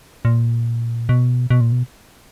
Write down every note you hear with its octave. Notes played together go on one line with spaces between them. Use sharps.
A#2
B2
B2
A#2
B2